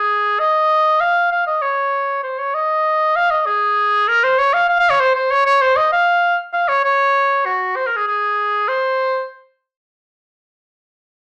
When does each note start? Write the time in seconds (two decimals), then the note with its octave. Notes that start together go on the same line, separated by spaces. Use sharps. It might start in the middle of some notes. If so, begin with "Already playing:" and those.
Already playing: G#4
0.39 D#5
1.01 F5
1.31 F5
1.47 D#5
1.62 C#5
2.23 C5
2.39 C#5
2.54 D#5
3.16 F5
3.31 D#5
3.46 G#4
4.08 A#4
4.23 C5
4.39 C#5
4.54 F5
4.69 F5
4.79 F5
4.90 C#5
5.00 C5
5.15 C5
5.31 C#5
5.46 C#5
5.61 C5
5.76 D#5
5.92 F5
6.53 F5
6.68 C#5
6.84 C#5
7.45 F#4
7.76 C5
7.86 A#4
7.96 G#4
8.07 G#4
8.68 C5